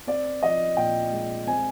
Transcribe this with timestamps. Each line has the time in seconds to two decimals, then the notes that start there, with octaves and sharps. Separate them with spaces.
0.07 C4 D5
0.43 F3 D#5
0.77 A#2 G5
1.12 G#3
1.47 C4 G#5